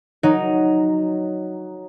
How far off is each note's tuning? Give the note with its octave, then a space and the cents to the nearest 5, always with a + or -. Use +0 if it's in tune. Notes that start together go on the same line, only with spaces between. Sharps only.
F#3 +0 D#4 +0